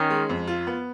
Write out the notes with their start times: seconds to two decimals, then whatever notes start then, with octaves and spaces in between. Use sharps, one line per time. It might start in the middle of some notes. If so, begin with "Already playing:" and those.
Already playing: D#3 C#4
0.10 G#3
0.29 F2
0.47 F4
0.67 B3